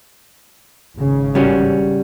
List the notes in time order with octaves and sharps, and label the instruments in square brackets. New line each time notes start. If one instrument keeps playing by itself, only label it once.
[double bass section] G#1 C#3
[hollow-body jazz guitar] G3 C#4 F#4